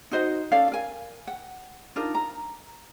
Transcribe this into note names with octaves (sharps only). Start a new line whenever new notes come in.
D#4 F#4 C5 D#5
C#4 A4 D5 F5
A#4 G#5
F#5
D4 D#4 F4 A#4
A#5